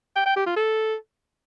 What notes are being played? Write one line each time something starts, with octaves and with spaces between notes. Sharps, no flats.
G5
G5
G4
F4
A4